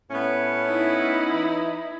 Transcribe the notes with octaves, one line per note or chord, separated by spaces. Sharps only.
A2 B3 C#4
D#4 E4
E3